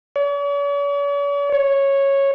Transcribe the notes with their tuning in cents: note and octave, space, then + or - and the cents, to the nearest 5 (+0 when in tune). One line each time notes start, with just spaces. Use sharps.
C#5 +45
C#5 -10